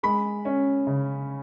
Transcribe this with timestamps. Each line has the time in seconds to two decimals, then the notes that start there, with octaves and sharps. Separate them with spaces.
0.03 G#3 B5
0.45 C#4
0.87 C#3